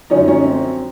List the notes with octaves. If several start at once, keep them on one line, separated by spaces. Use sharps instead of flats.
F#2 D3 F3 C#4 D#4
C#4
C4